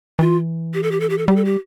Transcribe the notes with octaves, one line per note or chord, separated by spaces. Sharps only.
E3 F4
G4
A4
G4
A4
G4
A4
G3 G4
A4
G4